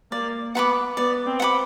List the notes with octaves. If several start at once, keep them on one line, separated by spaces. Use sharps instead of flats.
A#3 D5
B3 F#5 B5 D6
B3 D5
C4
F#5 B5 D6